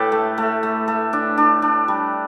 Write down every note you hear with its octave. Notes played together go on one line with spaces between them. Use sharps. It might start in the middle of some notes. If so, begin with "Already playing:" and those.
Already playing: A2 G4 A4 B4
A3
A3
A3
A3
D4
D4
D4
G3